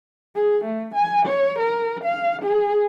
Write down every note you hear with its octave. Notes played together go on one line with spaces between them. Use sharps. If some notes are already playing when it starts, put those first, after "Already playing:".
G#4
A3
G#5
C#5
A#4
F5
G#4